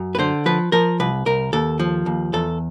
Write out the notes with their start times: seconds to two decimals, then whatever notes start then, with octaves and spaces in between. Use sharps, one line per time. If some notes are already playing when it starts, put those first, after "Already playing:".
Already playing: F#2
0.15 B4
0.19 D3 C5
0.46 F3 B4
0.72 F3 A#4
1.00 C2 B4
1.26 C2 A#4
1.53 D#2 A4
1.79 F3
2.06 D#2
2.33 E2 A4